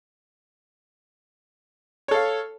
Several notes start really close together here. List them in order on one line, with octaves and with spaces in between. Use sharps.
C#5 A4 F5